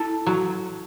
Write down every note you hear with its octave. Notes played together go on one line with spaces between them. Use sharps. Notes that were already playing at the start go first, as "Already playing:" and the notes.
Already playing: E4 A4
F#3 F#4